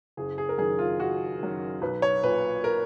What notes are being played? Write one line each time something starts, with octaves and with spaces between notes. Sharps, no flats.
F#1 G#4
G#4
A#4
F#2 D#3 G#4
F4
F#1 F#4
F#2 D#3
B1 B4
C#5
A#2 B4
A#4